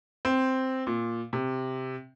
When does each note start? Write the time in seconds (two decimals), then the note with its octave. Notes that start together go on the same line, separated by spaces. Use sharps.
0.25 C4
0.87 A#2
1.33 C3